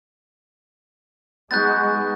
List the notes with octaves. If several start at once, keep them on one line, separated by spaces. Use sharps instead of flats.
G#3 B3 D#4 F#4 F#6 G6 A6